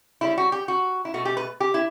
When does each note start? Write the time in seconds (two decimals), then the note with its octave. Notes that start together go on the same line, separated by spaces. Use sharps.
0.21 C#3 G3 E4
0.38 F#4
0.52 G4
0.68 F#4
1.05 E4
1.14 B2 A3 F#4
1.25 G4
1.37 B4
1.60 G4
1.74 E4